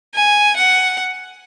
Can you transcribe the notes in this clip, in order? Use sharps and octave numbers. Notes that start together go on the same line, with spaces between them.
G#5
F#5